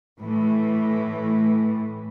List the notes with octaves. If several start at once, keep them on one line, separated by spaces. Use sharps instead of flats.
A2 E3 A3